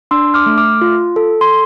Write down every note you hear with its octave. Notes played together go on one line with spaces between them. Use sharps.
D4 C6 E6
D6 F6
A3
D6 F6
F4
A4
C6